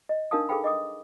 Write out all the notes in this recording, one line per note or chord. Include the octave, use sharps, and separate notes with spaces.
D#5
D4 D#4 A#4 F5 A5 D#6
G#4 A4 B4 F5 G5 B5
D#5 D6 D#6